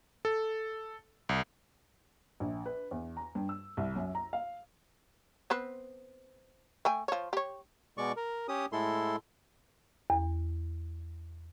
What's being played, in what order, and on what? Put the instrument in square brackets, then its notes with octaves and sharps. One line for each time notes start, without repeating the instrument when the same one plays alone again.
[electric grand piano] A4
C2
[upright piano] A#1
B4
E2
A#5
G2
E6
C2
F#2
A#5
F5
[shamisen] B3 C4 B4
A3 G5 G#5
F3 C#5
G4 C#5
[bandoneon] B2 G#3 D5 C#6
A#4
C#4 G4 D#6
A2 G#3 E4 A4 C6
[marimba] E2